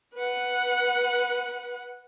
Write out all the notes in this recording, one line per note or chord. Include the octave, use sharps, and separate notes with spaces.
B4 F#5